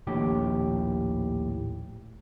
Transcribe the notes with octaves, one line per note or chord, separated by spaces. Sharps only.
A#1 D#2 A2 G4